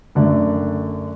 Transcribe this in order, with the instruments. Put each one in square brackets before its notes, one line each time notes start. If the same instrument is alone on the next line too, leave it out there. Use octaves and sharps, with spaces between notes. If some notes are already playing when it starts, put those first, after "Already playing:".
[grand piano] F#2 D3 A3 D5